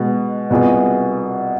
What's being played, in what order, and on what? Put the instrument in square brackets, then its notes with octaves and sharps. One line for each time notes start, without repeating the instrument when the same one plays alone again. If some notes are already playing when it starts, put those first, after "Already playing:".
Already playing: [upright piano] B2 G#3 B3
C2 B2 B3 F4 G#4